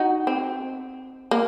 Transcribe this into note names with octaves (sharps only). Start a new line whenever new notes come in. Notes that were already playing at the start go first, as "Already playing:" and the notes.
Already playing: D#4 F#4
C4
A#3